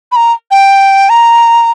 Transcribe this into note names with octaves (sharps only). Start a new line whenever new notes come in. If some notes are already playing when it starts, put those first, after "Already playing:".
B5
A#5
G5
A#5